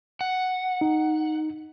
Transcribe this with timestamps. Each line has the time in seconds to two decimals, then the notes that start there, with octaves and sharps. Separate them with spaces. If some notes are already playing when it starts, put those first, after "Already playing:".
0.21 F#5
0.81 D#4